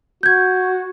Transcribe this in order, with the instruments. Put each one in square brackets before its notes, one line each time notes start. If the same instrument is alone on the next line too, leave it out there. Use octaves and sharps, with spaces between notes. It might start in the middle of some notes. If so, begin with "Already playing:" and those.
[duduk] F#4 [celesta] G6 G#6